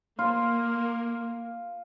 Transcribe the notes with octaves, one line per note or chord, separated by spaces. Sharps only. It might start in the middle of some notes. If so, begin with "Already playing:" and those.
A#3 F4